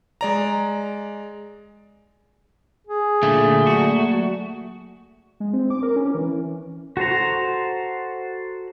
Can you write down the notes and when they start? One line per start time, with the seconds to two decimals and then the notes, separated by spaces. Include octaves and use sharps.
0.21 G#3 D5 A#5
2.87 G#4
3.23 A#2 D3 A3
3.67 F#3 A#3 F#4 D5
5.40 G#3
5.53 C4
5.70 D6
5.83 A#4
5.96 C#4
6.15 E3
6.97 F#4 A4 C5 A#5